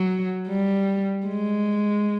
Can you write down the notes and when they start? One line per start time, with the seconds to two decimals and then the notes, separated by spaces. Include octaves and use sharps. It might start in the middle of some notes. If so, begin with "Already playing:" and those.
Already playing: F#3
0.48 G3
1.27 G#3